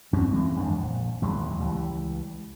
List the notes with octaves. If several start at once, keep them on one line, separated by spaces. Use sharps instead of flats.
E2 G2 C4 C#4
C#2 E3 G#3 C4
G1 F2 D#3 D4
A#1
A1 D#2 F#3 G#3
C#2 E3 G3